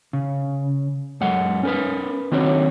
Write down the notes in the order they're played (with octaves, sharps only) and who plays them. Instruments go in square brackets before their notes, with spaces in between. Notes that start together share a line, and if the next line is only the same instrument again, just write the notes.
[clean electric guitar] C#3
F#2 G#3 F#5
C#4 A#4 B4
D#3 C4 D4 F#4 C5 C#5